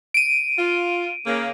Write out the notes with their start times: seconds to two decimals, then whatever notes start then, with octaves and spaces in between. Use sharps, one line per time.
0.14 D7 D#7
0.57 F4
1.26 C#3 A#3